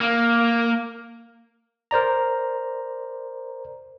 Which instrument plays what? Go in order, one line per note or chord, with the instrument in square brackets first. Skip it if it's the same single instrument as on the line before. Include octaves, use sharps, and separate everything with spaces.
[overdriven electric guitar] A#3
[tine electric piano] A#4 C5 D5 A#5